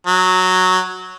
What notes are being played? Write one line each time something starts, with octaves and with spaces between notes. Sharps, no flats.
F#3